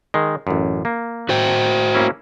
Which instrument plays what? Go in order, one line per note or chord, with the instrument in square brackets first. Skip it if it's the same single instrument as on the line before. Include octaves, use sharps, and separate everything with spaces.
[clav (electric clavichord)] D#3 G#3
A1 F#2
A#3
[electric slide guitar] F#4 C5 G5
[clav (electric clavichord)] A#3 C#4 E4